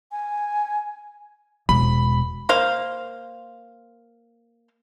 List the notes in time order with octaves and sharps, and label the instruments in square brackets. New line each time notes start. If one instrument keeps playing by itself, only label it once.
[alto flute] G#5
[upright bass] E1 [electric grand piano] B5
[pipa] A#3 C5 F5